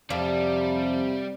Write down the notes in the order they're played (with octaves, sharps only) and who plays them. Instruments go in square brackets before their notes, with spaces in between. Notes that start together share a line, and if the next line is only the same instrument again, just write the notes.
[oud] F2 [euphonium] C3 [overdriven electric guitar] G3 [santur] D5